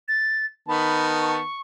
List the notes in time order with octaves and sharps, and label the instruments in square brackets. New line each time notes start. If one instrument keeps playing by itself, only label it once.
[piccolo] A6
[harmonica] D#3 B3 A5 [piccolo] B5
[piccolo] C#6